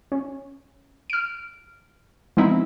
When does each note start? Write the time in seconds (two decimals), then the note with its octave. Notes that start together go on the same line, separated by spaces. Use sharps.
0.12 C#4
1.10 F6 D7
2.37 F3 G#3 B3 C4 D#4 E4